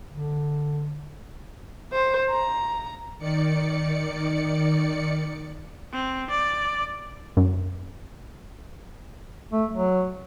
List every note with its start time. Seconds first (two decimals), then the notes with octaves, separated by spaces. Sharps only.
0.10 D3
1.93 C5
2.31 A#5
3.19 D#3 D5 C#7
5.93 C4
6.30 D5
7.37 F#2
9.51 A3
9.72 F#3